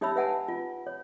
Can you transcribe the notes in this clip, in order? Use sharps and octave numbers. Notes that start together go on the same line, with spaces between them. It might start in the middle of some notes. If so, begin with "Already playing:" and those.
D#4 G4 C#5 E5 B5 E6
B4 E5 F#5 G#5 A5
F4
C#5